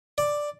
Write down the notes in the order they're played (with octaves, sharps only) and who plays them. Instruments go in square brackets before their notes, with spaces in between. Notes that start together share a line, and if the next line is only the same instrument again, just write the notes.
[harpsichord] D5